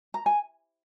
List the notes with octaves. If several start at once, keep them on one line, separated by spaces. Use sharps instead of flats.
A#5
G#5